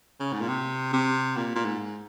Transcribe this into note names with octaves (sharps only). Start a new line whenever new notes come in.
C#3
G#2
A#2
C3
C3
A#2
A#2
G#2